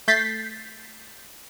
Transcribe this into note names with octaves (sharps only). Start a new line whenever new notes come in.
A3 G6 A6 B6 C7